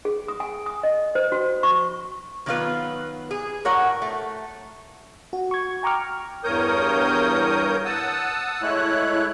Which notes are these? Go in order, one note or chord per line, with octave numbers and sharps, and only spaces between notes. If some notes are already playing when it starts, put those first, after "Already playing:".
G#4
D#6
G#5
D#6
D#5
C5
F#4
C#6
D#3 F#3 B3 E4 F4 B4
G#4
A2 F#4 A#4 C#5 F#5
A3
F#4
C#6 G#6
G5 A#5 C#6 D6 F6
E2 G2 A#4 C#5 D#6 G6
F#5 A5 D#6 E6
G#3 A3 E4 C#5 F#6